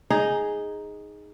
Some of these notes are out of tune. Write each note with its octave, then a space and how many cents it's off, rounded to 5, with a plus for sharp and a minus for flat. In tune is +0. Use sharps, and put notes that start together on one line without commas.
D#4 +0 G#4 +0